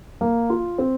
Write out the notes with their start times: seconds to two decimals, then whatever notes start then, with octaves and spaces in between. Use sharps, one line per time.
0.21 A#3
0.50 F4
0.78 C4